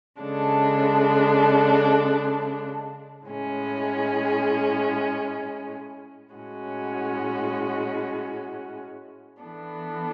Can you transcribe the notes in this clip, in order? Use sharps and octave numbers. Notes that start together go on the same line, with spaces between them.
C#3 G#3 D4 A4
A2 G#3 C#4 G#4
A2 G#3 C#4 F#4
E3 B3 D4 A4